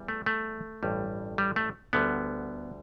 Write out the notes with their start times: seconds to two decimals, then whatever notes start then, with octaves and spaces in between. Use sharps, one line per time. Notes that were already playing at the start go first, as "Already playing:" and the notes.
Already playing: E2 E3 G3
0.08 A3
0.26 A3
0.83 A1 G2 G3
1.38 G3
1.56 A3
1.93 D2 D3 G3 B3